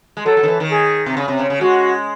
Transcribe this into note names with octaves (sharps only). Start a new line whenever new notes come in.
G#3
F#3 A4
F#3
D#3
E3
D#3
G#4
C3
C#3
C3
C#3
C#3
G#3 F#4